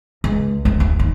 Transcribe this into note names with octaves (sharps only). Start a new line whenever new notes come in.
C#2
D2
D2
D#2